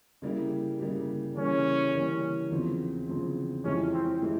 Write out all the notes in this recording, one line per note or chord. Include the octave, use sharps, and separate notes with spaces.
C#3 G3 A#3 E4 G4
C#3 G3 A#3 E4 G4
C#3 E3 G3 A#3 C#4
C#3 E3 G3 A#3
E2 C#3 F3 C4
E2 C#3 F3 C4
F2 E3 G#3 C#4 E4 G4
C4
E3 G#3 E4 G4